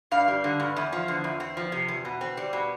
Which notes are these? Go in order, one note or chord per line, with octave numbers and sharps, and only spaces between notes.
G2 F5
G3
D3
G2
E2
F3
D3
E2
C4
F3
C3
E2
B2
C4
G3
B2